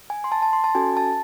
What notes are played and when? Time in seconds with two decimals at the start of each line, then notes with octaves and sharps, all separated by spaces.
0.10 G#5
0.24 C6
0.32 A5
0.42 A5
0.53 C6
0.64 A5
0.75 C#4 F#4 A4 G#5
0.97 A5